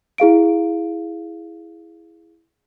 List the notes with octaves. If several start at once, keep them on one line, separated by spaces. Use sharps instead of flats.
E4 G#4 F5 D7